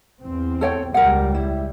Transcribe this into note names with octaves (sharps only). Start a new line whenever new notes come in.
E2 C4
A4 C#5 G5
C#2 G3 A#4 F#5
E4